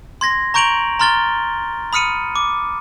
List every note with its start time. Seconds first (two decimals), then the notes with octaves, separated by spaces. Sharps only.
0.21 C6 G#6 A#6
0.54 A#5 C#6 G6 D7 F7 F#7
0.99 A#5 C6 F6 A6 G7
1.93 B5 D#6 F6 C#7 D#7
2.36 D6